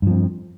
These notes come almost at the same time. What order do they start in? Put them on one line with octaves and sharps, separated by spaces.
G2 F3 C4